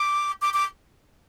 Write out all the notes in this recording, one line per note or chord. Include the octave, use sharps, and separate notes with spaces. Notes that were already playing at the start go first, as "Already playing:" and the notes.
Already playing: D6
D6
D6